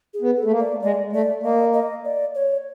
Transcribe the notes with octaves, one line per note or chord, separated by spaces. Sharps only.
G#4
B3
A4
A3
A#3
D5
G#3 D5
A3 D5
A#3 D#5
D#5
D5
C#5